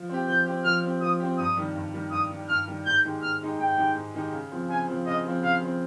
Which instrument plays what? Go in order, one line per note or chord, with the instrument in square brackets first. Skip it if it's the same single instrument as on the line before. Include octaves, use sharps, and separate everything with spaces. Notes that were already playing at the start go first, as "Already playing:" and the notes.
Already playing: [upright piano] F3
C4 G4
[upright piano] F3 [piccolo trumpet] G6
[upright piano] C4 G4
[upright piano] F3 [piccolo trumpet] F6
[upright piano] C4 G4
[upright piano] F3 [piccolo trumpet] D#6
[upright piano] C4 G4
[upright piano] G2 [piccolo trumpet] D#6
[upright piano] D#3 G3
G2
D#3 G3
[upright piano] G2 [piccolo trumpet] D#6
[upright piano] D#3
G3
[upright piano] G2 [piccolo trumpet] F6
[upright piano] D#3 G3
[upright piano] G#2 [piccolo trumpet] G6
[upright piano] D#3 G#3 D#4 G4
[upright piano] G#2 [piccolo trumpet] F6
[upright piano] D#3 G#3 D#4 G4
[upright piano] G#2 [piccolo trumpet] G5
[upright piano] D#3 G#3 D#4 G4
G#2
D#3 G#3 D#4 G4
C#3
F3 C4
[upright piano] C#3 [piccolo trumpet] G#5
[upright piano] F3 C4
[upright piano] C#3 [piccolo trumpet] D#5
[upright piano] F3 C4
[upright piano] C#3 [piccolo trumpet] F5
[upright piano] F3 C4